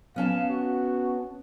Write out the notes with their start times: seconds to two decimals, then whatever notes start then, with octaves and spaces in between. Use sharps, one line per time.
0.16 B3 C#4 F5 A5
0.49 F#4